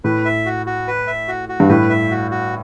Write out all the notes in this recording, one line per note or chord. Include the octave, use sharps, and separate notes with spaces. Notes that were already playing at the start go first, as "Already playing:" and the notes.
A2 B4
E5
F#4
F#4
B4
E5
F#4
F#4
G2
A2 B4
E5
F#4
F#4